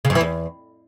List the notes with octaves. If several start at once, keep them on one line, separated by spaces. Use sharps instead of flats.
C#3
F#2
E3
E2